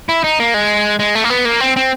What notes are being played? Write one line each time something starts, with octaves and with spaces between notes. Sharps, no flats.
E4
D#4
A#3
G#3
G#3
A3
A#3
B3
A#3
C4
C4